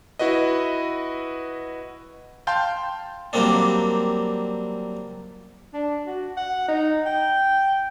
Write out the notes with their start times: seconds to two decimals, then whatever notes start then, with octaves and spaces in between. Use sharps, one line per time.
0.19 E4 F#4 B4 D#5
2.47 F5 G5 A5 C6 G6
3.33 F#3 G3 A#3 C4 D4
5.74 D4
6.07 F#4
6.37 F#5
6.68 D#4
7.06 G5